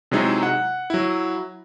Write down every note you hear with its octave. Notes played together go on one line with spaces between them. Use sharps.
C3 F#3 G#3 D#4 E4
F#5
F#3 E4